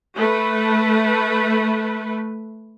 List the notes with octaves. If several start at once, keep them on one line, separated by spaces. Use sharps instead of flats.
A3 B4